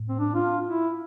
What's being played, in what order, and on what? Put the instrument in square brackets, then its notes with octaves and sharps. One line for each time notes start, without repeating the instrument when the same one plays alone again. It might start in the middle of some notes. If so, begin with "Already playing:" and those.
Already playing: [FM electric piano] A2
[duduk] C4
D4
F4
E4